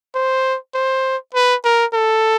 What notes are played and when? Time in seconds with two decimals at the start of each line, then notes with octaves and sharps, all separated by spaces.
0.15 C5
0.74 C5
1.34 B4
1.64 A#4
1.94 A4